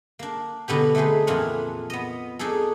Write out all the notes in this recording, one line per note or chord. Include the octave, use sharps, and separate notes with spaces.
A#3 D4
B2 D3 B3 G4
A3 C4 D#4 G#4 B4
F2 A#2 E3 D4 C#5 F#5
B3 D#5
D4 D#4 G#4 A4